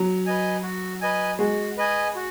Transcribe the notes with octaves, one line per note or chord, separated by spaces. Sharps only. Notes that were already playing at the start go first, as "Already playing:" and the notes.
Already playing: F#3
B4 D#5 G#5
F#4
B4 D#5 G#5
G#3 F#4
B4 D#5 G#5
F#4